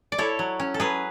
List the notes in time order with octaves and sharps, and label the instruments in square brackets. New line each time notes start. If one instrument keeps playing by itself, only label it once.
[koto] D5
E4 A4 C#5
F#3
C#4
A4
F#3 G#4 B4